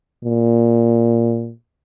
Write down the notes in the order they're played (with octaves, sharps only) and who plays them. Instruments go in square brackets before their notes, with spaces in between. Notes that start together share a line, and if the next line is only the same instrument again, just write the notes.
[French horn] A#2